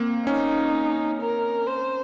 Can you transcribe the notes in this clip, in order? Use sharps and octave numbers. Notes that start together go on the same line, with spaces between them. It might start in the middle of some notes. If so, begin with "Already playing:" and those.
Already playing: A#3 C4
C#4 D#4
A#4
C5